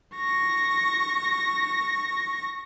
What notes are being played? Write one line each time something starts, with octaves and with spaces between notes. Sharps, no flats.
C#6 A#6